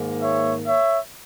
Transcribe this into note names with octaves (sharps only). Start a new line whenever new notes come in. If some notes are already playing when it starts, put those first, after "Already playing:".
Already playing: G#2 D#3 A#3
C#5 E5
C#5 E5